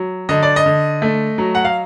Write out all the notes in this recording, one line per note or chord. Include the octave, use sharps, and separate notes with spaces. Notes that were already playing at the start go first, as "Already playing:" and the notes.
Already playing: F#3
D3 D#5
D5
D#5
D3
A3
F#3
F#5
F5